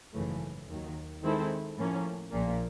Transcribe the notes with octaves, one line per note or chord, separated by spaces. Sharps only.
G#1 F#2 C#3 E3 A3
D#2 D#3 F#3
D#3 G#3 C4 E4 A4
A2 F3 A#3 C#4
A#1 A#2 F3 A#3